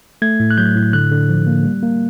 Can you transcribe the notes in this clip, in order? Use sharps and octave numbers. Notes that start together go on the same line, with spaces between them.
A3 G#6
A2
F#6
F#3 G6
A2
D3 F#6
D3
F3
A#3
G3
A#3